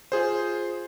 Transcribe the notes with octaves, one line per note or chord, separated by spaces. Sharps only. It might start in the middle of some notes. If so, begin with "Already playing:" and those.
F4 G#4 C5